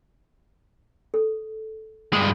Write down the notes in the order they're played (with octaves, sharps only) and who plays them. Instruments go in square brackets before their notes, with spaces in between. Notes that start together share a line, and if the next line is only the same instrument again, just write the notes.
[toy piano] A4
[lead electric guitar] G2 G#3 [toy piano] D#6